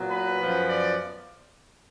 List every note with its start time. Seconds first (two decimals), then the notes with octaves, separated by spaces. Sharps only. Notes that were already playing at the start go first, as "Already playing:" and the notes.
Already playing: A#2 F#3 B3
0.11 B4
0.39 F#2 F3 B3
0.68 D5